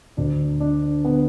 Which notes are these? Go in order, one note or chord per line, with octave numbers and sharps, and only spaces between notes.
D2 D3 D4
D4
D3 B3